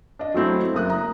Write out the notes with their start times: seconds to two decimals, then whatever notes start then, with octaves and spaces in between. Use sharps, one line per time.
0.19 D4 D#5
0.34 F#3 A3 C4 E4
0.74 F#1 A#3 D#6 F#6
0.90 A#5